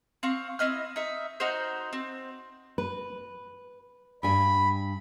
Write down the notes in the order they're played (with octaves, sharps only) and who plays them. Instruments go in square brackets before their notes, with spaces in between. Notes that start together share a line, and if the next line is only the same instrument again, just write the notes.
[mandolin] C4 F5 C#6
C4 E4 D#5 F6
D#4 E5
D#4 F#4 A#4 C5
C4
[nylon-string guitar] B4
[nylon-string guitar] G2 G#5 [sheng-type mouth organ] B5